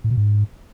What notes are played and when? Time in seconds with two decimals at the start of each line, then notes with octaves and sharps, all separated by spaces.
0.04 A2
0.11 B2
0.17 G#2